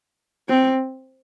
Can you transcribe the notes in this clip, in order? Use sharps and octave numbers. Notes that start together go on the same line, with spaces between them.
C4